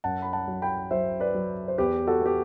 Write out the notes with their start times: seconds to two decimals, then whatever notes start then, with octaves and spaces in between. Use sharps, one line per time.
0.04 F#2 F#5 A5
0.22 B5
0.33 F#5 A5
0.48 F#3
0.62 G5 B5
0.91 F#3 C5 E5
1.20 B4 D5
1.34 F#3
1.68 C5
1.78 E2 G4 B4
2.07 F#4 A4
2.22 B3 G4